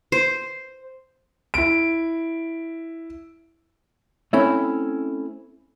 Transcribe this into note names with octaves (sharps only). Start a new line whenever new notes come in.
C5
E4 D7
A3 C4 C#4 E4